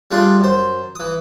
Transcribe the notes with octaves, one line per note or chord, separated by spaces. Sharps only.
G3 A3 D4 F4 G#4 C6
F#2 C5
E3 D#6